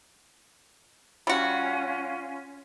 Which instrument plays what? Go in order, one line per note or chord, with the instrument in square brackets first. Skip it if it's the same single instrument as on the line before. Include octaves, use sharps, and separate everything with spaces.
[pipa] G3 F#4 [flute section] C#4 F4